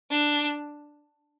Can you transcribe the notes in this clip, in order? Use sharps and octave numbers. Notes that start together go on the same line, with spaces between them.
D4